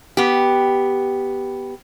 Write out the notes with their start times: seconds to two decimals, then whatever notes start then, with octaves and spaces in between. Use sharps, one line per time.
0.17 B3 G4